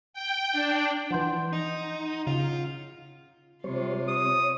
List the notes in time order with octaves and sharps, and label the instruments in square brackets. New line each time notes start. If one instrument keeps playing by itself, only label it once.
[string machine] G5
D4
[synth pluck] E3 F3 [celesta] F#5 C6 G6
[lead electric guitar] D#4
[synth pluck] C#3 [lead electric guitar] F4
[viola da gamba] C3 F4 [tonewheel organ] G3 C5 C#5
[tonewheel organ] C#5 [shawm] D#6